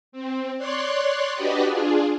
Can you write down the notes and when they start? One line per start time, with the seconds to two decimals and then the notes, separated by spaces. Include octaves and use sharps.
0.12 C4
0.58 C#5 D5 C6 F#6
1.34 D4 F#4 G4 B4 D5 D#5
1.65 D4 F4 G#4